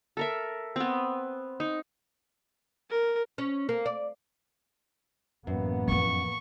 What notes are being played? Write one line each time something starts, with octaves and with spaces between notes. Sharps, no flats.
A4 A#4 E5
B3 C4
D#4
A#4
C#4
A#3
D5
A1 F#2 A#3 B3
F2 E3 C#6